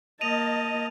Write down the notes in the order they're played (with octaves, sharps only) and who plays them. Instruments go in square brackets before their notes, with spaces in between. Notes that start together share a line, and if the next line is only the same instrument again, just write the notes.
[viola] A#3 A5 [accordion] D#5 [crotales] D#7 F7